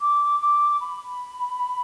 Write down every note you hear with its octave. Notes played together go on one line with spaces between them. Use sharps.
D6
D6
B5